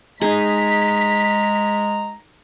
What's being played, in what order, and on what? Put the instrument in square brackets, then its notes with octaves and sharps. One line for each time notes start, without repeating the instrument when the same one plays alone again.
[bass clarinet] G#3 [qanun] D#4 G#4 [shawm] A#5 [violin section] B6